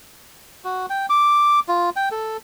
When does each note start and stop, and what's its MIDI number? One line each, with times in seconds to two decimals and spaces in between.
0.64 0.86 66
0.90 1.06 79
1.10 1.60 86
1.68 1.90 65
1.96 2.09 79
2.11 2.37 69